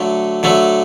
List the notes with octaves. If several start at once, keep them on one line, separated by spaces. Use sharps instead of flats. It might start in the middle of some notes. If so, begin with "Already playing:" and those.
Already playing: D3 F#3 A3
D3 F#3 A3